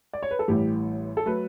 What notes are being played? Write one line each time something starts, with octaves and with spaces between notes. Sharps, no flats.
D5
C#5
B4
A4
A1 A2 E3 G3 G4
A4
F#3 A3 B4